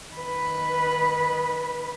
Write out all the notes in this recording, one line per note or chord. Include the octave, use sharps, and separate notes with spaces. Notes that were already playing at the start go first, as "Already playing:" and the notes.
D#3 B4